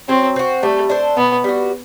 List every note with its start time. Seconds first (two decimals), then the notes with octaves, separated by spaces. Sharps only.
0.09 F#3 C4
0.36 C4 F#4
0.63 G3 A3
0.89 D4 A4 C5
1.17 B2 B3
1.44 G3 B3 F#4